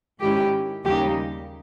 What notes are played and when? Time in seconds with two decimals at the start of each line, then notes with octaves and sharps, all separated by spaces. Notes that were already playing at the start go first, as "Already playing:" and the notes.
0.20 G#2 D#3 G#3 C#4 E4 G4
0.85 D#2 C#3 G3 A#3 D#4 G4